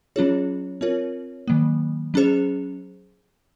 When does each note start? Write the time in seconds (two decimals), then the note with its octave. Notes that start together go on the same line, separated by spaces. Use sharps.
0.16 F#3 C#4 F4 G#4 C#5
0.81 C4 F4 A#4 C#5
1.48 D#3 F#3 A#3
2.14 F#3 C#4 G#4 C5